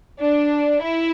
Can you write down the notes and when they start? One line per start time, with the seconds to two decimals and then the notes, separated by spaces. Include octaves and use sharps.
0.20 D4
0.82 E4